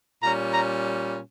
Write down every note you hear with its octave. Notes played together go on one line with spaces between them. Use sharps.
A#2 G3 C#4 A#5
A#5